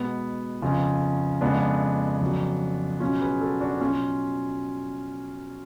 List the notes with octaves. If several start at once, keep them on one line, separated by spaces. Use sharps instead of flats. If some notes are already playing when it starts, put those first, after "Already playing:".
Already playing: B2 G#3 B3
F2 C#3 F3
F2 C#3 F3 G#3 B3 D4
F2 C#3 F#3
B2 F#3 C#4 F4
G#4 B4
F#4 A4
D4 F#4
B2 F#3 C#4 F4